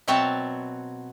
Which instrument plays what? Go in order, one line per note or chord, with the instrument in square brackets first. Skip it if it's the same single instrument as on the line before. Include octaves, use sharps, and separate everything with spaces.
[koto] B2 F#3 C4 C#5 E5 A5